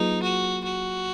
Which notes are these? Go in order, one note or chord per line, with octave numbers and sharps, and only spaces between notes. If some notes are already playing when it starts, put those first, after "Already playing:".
Already playing: F#3 A#3 D#4 F4 G#4 B4
F#4
F#4